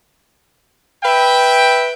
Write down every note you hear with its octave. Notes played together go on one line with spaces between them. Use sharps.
B4 E5 G5